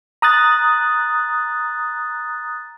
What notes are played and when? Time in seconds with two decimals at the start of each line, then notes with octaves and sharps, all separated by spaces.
0.22 A#5 D#6 F#6 A6